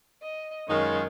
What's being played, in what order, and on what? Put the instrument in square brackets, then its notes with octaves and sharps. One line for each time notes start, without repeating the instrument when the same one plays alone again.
[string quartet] D#5
[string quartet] F#2 D#3 C#5 [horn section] G#3 D#4 F4